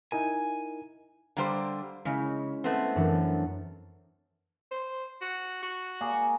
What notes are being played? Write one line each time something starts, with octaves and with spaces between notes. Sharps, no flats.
D#4 E4 A#4 G#5
D3 G3 C5 F5 A#5
C#3 G#3 C#4 E4
A3 B3 C4
F#2 E3 D4
C5
F#4
F#4
A#3 G#4 A#4